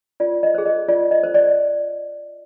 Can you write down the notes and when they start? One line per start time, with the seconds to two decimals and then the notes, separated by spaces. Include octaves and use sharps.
0.20 F4 D5
0.43 D#5
0.54 G#4 C5
0.66 D#5
0.88 F4 D5
1.11 D#5
1.23 C5
1.34 D5